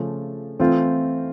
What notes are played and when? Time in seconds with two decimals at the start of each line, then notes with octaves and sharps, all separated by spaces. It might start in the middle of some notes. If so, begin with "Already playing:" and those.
Already playing: C#3 F3 A3 C#4
0.59 E3 A3 C4 F4